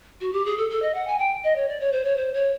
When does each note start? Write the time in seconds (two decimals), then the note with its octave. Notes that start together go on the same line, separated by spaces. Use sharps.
0.21 F#4
0.33 G4
0.46 G#4
0.58 A4
0.70 A4
0.82 D#5
0.95 F#5
1.07 G#5
1.19 G5
1.44 D#5
1.56 C#5
1.68 D5
1.80 C#5
1.92 C5
2.05 C#5
2.17 C5
2.34 C#5